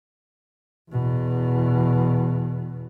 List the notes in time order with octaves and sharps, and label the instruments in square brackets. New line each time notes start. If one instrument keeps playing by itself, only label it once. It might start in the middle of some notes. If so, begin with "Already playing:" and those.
[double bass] E2 B2